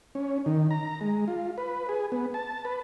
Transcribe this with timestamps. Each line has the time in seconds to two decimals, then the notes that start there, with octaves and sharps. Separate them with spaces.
0.15 C#4
0.46 D#3
0.71 A#5
1.01 G#3
1.28 F4
1.58 B4
1.89 G#4
2.12 B3
2.34 A5
2.65 B4